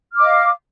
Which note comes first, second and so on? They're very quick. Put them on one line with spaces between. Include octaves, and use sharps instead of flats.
F6 D6 D#5 F5